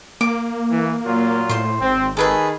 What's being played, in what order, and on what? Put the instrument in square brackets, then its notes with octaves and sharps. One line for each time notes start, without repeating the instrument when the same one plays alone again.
[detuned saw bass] A#3 [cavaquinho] D6
[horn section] E3
A#2 F#3 F4
[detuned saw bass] A2 [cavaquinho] C5 C6
[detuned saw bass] G#1 [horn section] C4
[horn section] D#3 G#4 [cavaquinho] A4 B4 E5